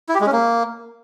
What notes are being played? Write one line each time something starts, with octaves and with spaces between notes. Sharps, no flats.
E4
G4
G#3
C#4
A#3